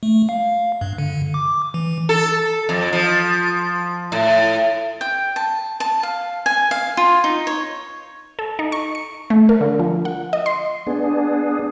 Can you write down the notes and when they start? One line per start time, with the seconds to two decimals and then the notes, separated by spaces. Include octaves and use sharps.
0.03 A3
0.29 F5
0.81 G2
0.98 D3
1.34 D6
1.74 E3
2.09 A4
2.69 F2
2.93 F3
4.12 A2
5.01 G5
5.36 A5
5.80 A5
6.03 F5
6.46 G#5
6.71 F5
6.97 F4
7.24 D#4
7.47 C#5
8.39 A4
8.59 D#4
8.72 C#6
8.95 C#7
9.30 A3
9.49 A#4
9.61 D3
9.80 F3
10.05 F#5
10.33 D#5
10.46 C6
10.87 B3 D4 G#4